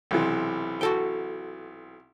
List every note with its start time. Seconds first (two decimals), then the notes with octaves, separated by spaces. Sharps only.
0.11 B1 C3 E3
0.81 F#4 A4 G5